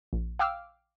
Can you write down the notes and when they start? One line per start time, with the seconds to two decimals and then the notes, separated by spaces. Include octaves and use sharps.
0.13 A#1
0.39 F5 G5 D6 E6 F6